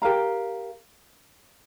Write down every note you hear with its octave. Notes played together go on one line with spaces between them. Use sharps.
G4 A#4 F5 A#5